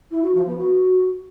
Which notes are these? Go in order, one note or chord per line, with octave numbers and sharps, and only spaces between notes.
E4
F#4
F3
B3
F#4